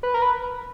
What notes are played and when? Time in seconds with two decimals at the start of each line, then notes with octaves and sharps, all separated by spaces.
0.03 B4
0.14 A#4
0.22 B4